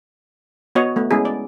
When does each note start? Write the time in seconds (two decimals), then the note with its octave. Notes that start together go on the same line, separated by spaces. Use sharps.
0.75 B3 F#4 C#5 D#5
0.96 A3 B3
1.11 G#3 B3 C#4 E4 G#4
1.25 D5